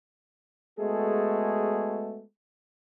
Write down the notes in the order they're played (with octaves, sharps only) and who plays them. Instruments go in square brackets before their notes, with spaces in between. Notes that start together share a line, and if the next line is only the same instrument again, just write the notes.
[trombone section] G#3 A3 B3 F#4 G#4 A4